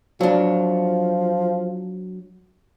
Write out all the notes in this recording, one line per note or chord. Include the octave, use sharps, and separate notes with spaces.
F3 F#3 D4